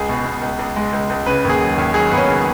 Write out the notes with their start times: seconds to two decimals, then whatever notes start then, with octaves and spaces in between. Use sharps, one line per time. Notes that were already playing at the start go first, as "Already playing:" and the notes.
Already playing: C#2 G#4
0.09 B2
0.26 B2
0.42 C#2
0.59 C#2
0.76 G#3
0.93 C#2
1.10 C#2
1.26 C#3 B4
1.44 D#2 G#4
1.61 F#3
1.78 D#2
1.94 F#3 G#4
2.11 D#2 B3
2.17 C#4
2.29 C#3